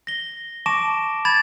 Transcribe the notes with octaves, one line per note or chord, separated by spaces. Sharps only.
A#6 G7
A5 C#6 D6 A#6 D7 E7
B5 G#6 A6 E7